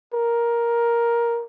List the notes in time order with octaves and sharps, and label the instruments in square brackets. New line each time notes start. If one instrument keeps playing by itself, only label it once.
[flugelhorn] A#4